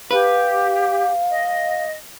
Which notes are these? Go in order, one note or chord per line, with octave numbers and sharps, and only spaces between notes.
G4 B4 F5
D#5